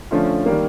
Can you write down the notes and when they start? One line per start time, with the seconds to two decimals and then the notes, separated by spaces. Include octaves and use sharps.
0.11 D3 F3 A3 C#4 F4
0.46 D#3 G3 A#3